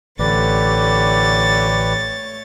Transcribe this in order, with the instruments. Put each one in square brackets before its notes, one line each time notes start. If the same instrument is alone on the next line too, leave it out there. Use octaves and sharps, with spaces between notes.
[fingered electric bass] A1 [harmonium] D3 [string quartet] A3 C#5 A6 [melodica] G4 B4 D5